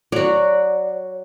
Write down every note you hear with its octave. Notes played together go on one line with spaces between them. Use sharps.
F#3 F#4 C#5 D5